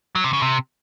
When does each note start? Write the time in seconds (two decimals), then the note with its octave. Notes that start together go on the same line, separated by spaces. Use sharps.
0.15 F#3
0.24 C3
0.33 C#3
0.42 C3